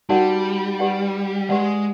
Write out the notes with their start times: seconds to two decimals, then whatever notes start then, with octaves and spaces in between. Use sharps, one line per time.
0.09 G3 D#4 F#4 A#4 D5 F#5
0.79 G4 B4 D5 F#5
1.49 G#3 G4 B4 D5 F#5